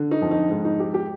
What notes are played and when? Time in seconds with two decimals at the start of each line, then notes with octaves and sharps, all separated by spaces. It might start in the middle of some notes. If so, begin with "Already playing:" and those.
Already playing: D3
0.11 D#4
0.21 F2
0.31 D#4
0.50 G#2
0.65 D#4
0.79 G#3 G4
0.94 G4